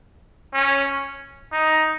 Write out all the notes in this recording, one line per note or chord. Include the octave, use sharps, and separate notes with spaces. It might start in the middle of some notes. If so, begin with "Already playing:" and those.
C#4
D#4